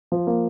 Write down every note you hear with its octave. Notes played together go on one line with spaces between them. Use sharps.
F3
A#3